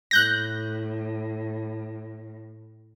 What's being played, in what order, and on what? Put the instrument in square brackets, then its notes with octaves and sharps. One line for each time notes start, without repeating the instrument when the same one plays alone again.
[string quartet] A2 [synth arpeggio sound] F#6 G6 A#6